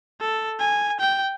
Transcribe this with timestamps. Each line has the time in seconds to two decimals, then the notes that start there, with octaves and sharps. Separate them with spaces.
0.20 A4
0.59 G#5
1.00 G5